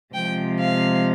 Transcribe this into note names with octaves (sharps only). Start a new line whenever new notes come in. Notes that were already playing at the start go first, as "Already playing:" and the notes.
C3 F3 G#3 G5
F5